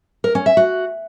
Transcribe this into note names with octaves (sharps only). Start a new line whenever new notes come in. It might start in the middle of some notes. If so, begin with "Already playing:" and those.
A#4
C#4
E5
F#4